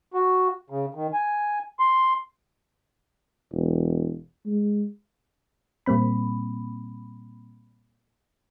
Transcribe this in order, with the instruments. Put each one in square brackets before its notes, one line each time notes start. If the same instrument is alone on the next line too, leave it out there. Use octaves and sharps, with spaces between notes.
[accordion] F#4
C#3
D#3
G#5
C6
[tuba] E1
G#3
[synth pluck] A#2 G3 A#3 C4 B5